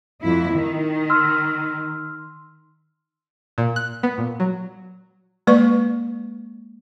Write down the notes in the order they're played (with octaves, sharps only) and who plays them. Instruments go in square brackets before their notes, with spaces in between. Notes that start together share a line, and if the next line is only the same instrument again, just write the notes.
[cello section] F2 E4
D#3
[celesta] C6 E6 F6
[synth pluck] A#2
F#6
B3
A#2
F#3
[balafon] G#3 A#3 B4 D5 C#6